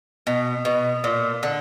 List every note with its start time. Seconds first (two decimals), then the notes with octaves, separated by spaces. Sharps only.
0.27 B2
0.65 B2
1.04 A#2
1.43 D3